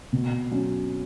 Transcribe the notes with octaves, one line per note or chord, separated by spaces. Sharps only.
B2
F#3 C#4